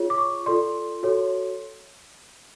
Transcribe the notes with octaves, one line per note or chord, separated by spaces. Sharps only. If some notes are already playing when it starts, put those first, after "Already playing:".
Already playing: F4 G#4 C#5
D6
C#6
F4 A4 D5 C6
F#4 A4 C#5